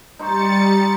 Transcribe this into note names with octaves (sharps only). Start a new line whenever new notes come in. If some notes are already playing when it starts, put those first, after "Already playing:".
G3 D#4 C5 C#6 A6 C#7